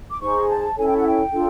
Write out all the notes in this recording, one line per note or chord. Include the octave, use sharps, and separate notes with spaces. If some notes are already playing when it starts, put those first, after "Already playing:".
D6
D#4 G#4 C5 C#6
A5
C#4 E4 A4 C#5 G#5
G5
F#5
G5
D4 F4 A4